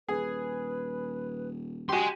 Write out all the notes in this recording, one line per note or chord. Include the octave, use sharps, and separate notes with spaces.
D#1 G#4 B4
F#4 G4 G#5 C6